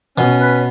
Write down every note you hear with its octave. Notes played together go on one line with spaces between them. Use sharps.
B2 C#4
B4